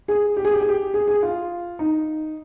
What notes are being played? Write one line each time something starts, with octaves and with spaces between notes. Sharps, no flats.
G#4
G4
G#4
G4
G#4
G4
G#4
G#4
F4
D#4